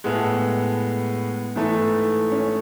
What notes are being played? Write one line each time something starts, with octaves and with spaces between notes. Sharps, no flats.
A2 G#3 B3
G#2 E3 A3
C#4